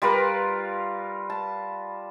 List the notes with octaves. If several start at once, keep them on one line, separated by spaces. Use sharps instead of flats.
G3 F4 A#4 B4
A5